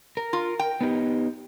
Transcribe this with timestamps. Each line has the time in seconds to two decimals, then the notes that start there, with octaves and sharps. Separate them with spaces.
0.17 A#4
0.33 F4
0.59 G5
0.81 B3 D#4 G4